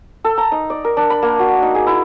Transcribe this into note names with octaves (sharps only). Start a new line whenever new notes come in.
A4
A#5
D#4
D5
A#4
D4
B5
A#3
F#4
D#4
G#4
E4